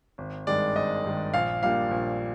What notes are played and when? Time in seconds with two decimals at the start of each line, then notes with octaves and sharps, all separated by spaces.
0.18 G#1
0.47 G2 D#3 G#3 D5
0.75 G#1 D#5
1.04 G2 D#3 G#3
1.34 A#1 F5
1.63 A#2 G3 A#3 D4 F5
1.91 A#1